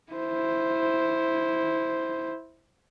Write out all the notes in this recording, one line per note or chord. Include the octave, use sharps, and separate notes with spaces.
E4 C5